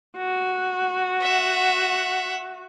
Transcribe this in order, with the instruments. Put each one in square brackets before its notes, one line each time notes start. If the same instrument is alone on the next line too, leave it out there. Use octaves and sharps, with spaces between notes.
[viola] F#4
[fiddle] E5 F#5